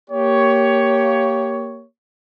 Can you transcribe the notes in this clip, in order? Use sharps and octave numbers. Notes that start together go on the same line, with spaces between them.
A#3 G4 C#5